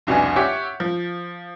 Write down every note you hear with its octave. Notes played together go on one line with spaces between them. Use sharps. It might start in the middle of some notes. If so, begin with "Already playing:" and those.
F1 C2 B2 D4 G#5
G4 C#5 E5 F#5
F3